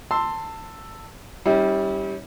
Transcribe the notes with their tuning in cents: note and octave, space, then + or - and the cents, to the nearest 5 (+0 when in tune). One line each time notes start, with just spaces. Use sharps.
A5 +20 C6 +0 E6 +0
G3 +0 C#4 +0 E4 -40